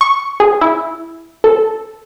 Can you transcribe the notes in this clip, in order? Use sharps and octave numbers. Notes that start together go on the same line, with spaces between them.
C#6
G#4
E4
A4